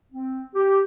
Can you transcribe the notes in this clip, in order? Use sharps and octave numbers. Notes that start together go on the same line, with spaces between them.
C4
G4